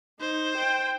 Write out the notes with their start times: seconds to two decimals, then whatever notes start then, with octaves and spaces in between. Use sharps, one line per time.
0.21 D#4 C5
0.57 G5